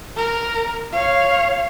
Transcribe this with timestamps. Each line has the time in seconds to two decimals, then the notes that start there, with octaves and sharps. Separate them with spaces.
0.16 A#4
0.92 C#5 F5